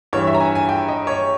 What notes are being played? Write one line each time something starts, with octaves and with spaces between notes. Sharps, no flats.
G2 E3 C#5
E5
A#5
G#5
G#5
G5
D#5
C#5